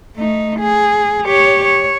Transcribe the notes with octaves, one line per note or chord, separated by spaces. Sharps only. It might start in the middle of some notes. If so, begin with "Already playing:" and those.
A3 D#4
G#4
G4 C#5
C#5